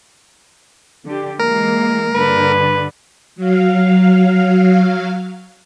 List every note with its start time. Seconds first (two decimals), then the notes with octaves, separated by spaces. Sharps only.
1.05 D3 G4
1.39 E3 G#3 A#3 A#4
2.15 G2 D3 B4
3.36 F#3 F5